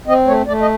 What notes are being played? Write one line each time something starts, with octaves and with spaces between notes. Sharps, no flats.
C4 D#5
A3 C#5
A3 D5
D#5